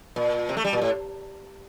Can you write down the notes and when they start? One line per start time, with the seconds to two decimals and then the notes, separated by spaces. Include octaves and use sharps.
0.16 A#2
0.49 C3
0.57 A3
0.65 G3
0.73 A#2
0.82 A2